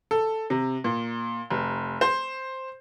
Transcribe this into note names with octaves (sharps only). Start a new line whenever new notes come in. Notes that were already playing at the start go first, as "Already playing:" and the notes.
A4
C3
A#2
F1
C5